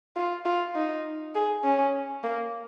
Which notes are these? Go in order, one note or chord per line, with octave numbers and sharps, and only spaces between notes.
F4
F4
D#4
G#4
C#4
A#3